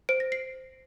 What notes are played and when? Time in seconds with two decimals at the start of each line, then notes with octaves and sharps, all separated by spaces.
0.09 C5 D7
0.20 A#6
0.32 C7